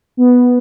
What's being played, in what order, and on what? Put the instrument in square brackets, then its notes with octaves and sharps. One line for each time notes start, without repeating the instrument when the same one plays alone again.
[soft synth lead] B3